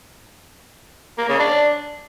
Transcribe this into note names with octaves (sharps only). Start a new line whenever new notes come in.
A#3
C#3
D4